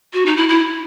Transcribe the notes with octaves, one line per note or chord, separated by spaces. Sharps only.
F#4
D#4
E4
E4